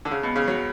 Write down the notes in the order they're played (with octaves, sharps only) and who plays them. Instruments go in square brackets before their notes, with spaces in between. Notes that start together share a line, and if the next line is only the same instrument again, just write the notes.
[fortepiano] D3
C#3
B2
C#3
F#3